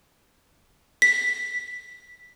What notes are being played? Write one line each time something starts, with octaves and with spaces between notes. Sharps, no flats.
B6